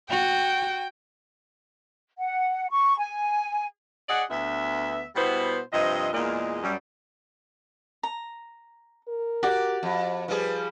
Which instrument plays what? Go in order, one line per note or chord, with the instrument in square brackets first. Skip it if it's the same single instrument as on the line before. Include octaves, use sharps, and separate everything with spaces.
[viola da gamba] F#4 [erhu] G5
[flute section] F#5
C#6
G#5
[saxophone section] G#4 D5 D#5 F#5
D2 B3 E5
B2 G3 B3 E4 C5
G2 C3 F3 D#5
E2 A#2 G#3 A#3 D5 D#5
F#2 G3
[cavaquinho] A#5
[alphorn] A#4
[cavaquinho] F#4 D5 [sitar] G4
[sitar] F2
[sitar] F3 G3 G#4 [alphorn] B4